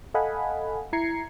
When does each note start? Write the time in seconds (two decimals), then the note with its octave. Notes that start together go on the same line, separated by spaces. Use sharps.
0.14 A4 D#5 F5 F#5 G#5 B5
0.93 E4 A#5 G#6 C7 C#7